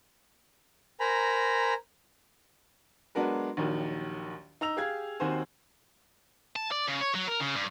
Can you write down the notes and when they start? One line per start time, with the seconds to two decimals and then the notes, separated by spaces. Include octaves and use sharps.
1.00 A#4 C5 G#5 A#5 B5
3.15 F#3 G#3 B3 D4 A#4 B4
3.57 A#1 D#2 D#3 F#3
4.61 D#4 A#5 E6 F7
4.77 G4 G#4 F5 G#6
5.20 D#2 D#3 C4 F#4 C5 G#5
6.56 A5
6.72 D5
6.88 C#3
7.01 C#5
7.15 F#3
7.28 A#4
7.40 C#3
7.55 G2